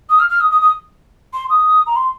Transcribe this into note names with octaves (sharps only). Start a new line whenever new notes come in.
D#6
F6
F6
D#6
D#6
D#6
C6
D#6
A#5
C6